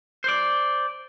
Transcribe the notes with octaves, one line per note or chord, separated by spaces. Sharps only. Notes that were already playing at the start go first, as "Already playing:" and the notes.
C5 D5